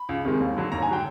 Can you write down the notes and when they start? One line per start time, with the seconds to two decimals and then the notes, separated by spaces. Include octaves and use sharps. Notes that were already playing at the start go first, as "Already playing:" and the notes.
Already playing: B5
0.09 C#2
0.25 C3 D#3 G#3
0.40 D#2
0.57 D3 F#3
0.72 D#2 A#5
0.83 G#5
0.88 D3 F#3 G5